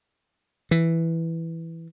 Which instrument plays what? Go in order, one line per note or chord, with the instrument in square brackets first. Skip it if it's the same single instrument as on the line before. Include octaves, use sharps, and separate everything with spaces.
[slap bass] E3